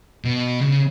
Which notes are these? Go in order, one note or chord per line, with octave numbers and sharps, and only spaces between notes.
B2
C#3